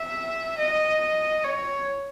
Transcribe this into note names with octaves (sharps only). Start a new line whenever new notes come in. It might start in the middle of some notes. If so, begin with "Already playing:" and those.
Already playing: E5
D#5
C#5